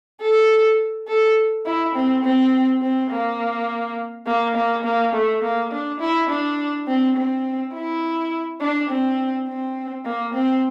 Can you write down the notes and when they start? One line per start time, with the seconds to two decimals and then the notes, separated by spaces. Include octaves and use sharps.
0.21 A4
1.08 A4
1.66 E4
1.95 C4
2.23 C4
2.82 C4
3.11 A#3
4.27 A#3
4.55 A#3
4.84 A#3
5.13 A3
5.42 A#3
5.71 D4
6.00 E4
6.29 D4
6.87 C4
7.16 C4
7.74 E4
8.61 D4
8.89 C4
9.48 C4
10.05 A#3
10.34 C4